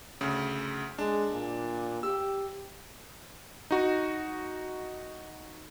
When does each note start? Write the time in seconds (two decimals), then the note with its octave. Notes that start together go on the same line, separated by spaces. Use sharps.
0.21 D2 C#3
0.98 G#3 D4
1.33 A#2
2.03 G4 E6
3.71 D#4 F#4